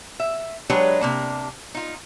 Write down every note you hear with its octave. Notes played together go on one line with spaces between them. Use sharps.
E5
F#3 G#3 D4 G4 B4 C#5
C3 A#3 D4
D#4 F4